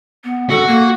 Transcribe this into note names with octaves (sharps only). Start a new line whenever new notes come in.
B3
F#4 A4
A#3